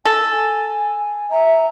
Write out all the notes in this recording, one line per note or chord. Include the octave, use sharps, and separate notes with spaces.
A4 G#5
E5 A#5